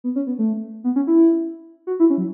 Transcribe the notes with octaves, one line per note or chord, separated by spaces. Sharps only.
B3
C#4
B3
A3
B3
C#4
E4
F#4
E4
C#4
F#3